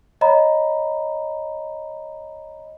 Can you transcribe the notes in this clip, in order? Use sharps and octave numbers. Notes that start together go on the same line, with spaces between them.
C#5 D#5 A#5 B5